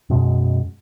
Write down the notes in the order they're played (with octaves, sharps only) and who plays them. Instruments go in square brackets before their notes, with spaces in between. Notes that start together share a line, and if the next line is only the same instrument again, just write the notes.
[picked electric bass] F#2 B2 G#3